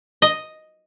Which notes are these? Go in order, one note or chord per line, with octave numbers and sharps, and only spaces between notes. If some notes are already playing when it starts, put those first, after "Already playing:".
D#5